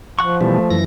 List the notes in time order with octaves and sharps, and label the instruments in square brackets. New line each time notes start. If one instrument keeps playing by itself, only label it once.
[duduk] F3 [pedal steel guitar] F#5 C#6
[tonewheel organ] B2 E3 G3 [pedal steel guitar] A3
[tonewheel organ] F#2 E3 A#6